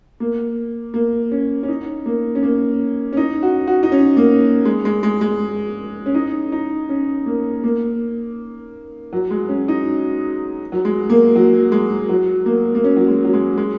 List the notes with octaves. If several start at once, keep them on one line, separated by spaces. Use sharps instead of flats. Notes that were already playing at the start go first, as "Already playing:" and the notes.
A#3
A#3
C#4
C#4
D#4
A#3
C#4
A#3
C#4
D#4
F#4
F#4
D#4
C#4
A#3
G#3
G#3
G#3
G#3
C#4
D#4
D#4
C#4
A#3
A#3
F#3
G#3
C#4
D#4
F#3
G#3
A#3
F#3
G#3
F#3
A#3
A#3
C#4
F#3
G#3
F#3
G#3
G#3